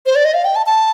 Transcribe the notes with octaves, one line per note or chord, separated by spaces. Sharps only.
C5
D5
D#5
F5
G5
A5
A5